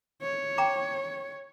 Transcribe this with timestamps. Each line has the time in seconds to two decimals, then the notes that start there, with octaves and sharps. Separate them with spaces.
0.22 C#5
0.58 G5 A#5 D6